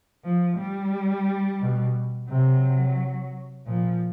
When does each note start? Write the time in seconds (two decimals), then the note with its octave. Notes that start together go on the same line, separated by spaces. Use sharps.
0.24 F3
0.58 G3
1.61 B2
2.30 C3 F#3
3.67 A#2 F3